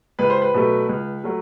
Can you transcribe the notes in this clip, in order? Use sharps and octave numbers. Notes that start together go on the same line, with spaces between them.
C#2 B4
C5
B4
B2 F#3 A3
C#2
F#3 A3